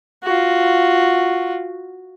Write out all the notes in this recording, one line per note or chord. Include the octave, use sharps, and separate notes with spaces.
F4 F#4